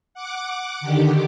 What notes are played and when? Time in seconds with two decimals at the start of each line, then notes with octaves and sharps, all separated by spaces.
0.14 F#5 D6
0.81 D3 D#3 G4